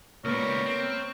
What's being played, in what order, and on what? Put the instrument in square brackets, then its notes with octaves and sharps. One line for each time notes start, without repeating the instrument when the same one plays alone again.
[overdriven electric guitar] C#2 G3 [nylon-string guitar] A#3 B3 [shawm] A#4 [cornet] C#5
[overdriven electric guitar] C4